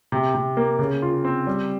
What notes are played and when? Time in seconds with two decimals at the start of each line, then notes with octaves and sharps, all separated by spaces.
0.12 C3
0.34 C3
0.57 A#3
0.79 C#3
1.02 F4
1.24 C4
1.47 G3